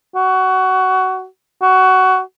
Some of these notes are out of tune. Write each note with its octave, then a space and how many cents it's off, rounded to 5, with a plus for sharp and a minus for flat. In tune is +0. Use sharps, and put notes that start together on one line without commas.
F#4 +20
F#4 +15